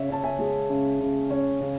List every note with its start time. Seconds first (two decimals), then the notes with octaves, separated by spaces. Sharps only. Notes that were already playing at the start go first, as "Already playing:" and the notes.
Already playing: C#3 C#5 E5
0.09 C#4 A5
0.23 E5 G#5
0.39 G#3
0.70 C#3
1.00 C#3
1.30 C#4
1.61 C#3